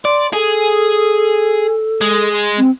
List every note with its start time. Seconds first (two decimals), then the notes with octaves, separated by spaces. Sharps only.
0.05 D5 C6
0.33 G#4 A4
2.01 G#3
2.58 C4